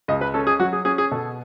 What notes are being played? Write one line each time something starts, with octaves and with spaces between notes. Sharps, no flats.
C#2 D#5
B4
C#4 A4
G#4
F#3 F#4
G#4
C#4 G#4
G#4
B2 A4